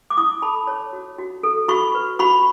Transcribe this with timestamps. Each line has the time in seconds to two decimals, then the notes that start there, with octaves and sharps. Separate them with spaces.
0.10 D6
0.17 E4 C#6 D#6
0.42 A4 A5 B5
0.67 C#5
0.93 F#4
1.18 F#4
1.43 A4
1.68 F#4 B5 C#6
1.95 B4
2.19 F#4 B5 C#6